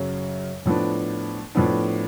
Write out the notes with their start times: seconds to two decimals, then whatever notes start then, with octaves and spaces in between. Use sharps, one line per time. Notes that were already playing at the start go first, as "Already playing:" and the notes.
Already playing: F#2 C#3 F#3 C#4
0.66 A2 F3 B3 D4
1.55 A2 F3 B3 D4